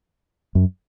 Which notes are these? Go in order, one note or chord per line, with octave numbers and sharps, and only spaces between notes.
F#2